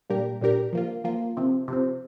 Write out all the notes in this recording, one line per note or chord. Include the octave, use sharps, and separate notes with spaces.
A#2 G3 D4 G4 A#4
A#2 G3 D4 G4 A#4
F3 A#3 F4
F3 A#3 F4
C3 F3 C4
C3 F3 C4